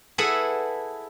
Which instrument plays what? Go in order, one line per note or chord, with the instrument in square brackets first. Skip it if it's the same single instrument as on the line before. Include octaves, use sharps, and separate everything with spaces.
[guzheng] E4 G#4 A4 B4 E5 F#5